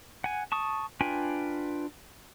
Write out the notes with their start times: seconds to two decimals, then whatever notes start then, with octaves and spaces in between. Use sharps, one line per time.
0.24 F#5 G#5
0.52 A5 C#6 D#6
1.01 D4 F4 B4 G5 G#5